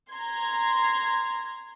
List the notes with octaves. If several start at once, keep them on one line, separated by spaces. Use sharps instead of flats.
A#5 C6 G#6